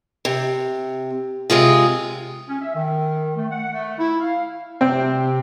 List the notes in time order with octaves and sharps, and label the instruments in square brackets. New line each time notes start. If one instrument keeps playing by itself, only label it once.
[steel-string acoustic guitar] C3
C3 G#3 F4 G#4
[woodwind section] C#4
E5
D#3
A3
F#5
A3
E4
F5
[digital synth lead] C3 [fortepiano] C4